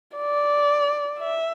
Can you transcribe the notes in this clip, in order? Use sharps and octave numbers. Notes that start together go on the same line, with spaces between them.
D5
E5